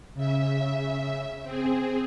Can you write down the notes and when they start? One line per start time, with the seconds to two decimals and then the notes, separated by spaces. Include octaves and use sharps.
0.14 C#3 E5
1.43 C4 G#4